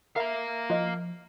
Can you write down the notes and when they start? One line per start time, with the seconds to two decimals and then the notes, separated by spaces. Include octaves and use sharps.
0.16 A#4 E5 F5 A#5
0.70 F3 F4 D#5